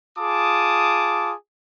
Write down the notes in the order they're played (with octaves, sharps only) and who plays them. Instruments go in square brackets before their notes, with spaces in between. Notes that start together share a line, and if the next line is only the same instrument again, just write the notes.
[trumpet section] F4 G#4 A5 D6 D#6